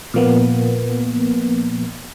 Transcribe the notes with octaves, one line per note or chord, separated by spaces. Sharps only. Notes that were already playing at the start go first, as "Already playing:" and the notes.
A#2 F3 A#3 B3